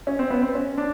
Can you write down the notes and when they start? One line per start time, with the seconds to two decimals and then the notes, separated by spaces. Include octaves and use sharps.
0.07 C#4
0.19 C4
0.30 B3
0.42 C4
0.55 C#4
0.78 D4